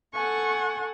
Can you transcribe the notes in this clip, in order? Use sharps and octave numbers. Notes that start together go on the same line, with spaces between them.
A4 F#5 G#5 C#6